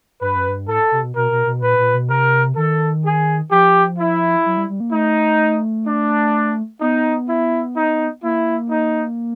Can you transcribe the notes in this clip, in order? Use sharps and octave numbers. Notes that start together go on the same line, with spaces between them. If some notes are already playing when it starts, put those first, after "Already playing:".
G2 B4
F#2
G2
A2 A4
C3
B2
B2 A#4
B2
B2
A#2 B4
A#2
B2
C3 A#4
D#3 A4
G#4
F3 G4
E4
F#3
G3
G3
A#3
A3 D#4
D4
B3 D#4
E4
D#4
A#3 E4
D#4